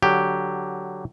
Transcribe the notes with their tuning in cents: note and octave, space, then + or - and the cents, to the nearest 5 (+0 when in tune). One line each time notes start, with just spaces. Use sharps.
D3 +0 F#3 +0 G4 +0